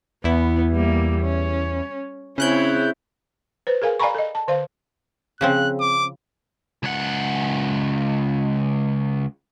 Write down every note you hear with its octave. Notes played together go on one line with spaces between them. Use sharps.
E2 B3 E4
G3 A#3
C#4
C#3 C4 C#4 E4 F#6 G6
B4 C5
G#4 A#4 F5 G#5
D5 F5 G#5 A#5 B5 C#6
A4 D#5
A5
D3 C5 D5 F5
C#3 F3 C4 F#6
D6
C#2 F#5